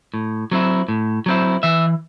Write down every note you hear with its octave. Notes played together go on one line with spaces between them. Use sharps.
A2
F#3 C4 E4
A2
F#3 C4 E4
E3 E5